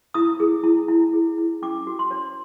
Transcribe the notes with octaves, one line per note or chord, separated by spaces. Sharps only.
E4 D#6
G#4
E4
E4
G#4
E4
C#4 D6
F#4
C6
C#5